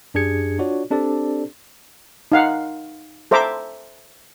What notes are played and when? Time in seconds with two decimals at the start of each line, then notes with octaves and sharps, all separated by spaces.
0.14 F#2 D4 G4 G#4 G#6 C#7
0.58 D4 F4 F#4 C#5 D5
0.91 C4 D4 G4 A4 C5 D5
2.32 D#4 F5 F#5
3.31 A4 C5 E5 A#5 D6